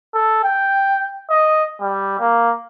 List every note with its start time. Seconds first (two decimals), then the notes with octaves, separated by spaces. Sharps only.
0.14 A4
0.44 G5
1.30 D#5
1.81 G3
2.20 A#3